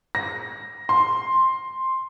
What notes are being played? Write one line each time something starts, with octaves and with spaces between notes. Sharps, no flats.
A#6
C6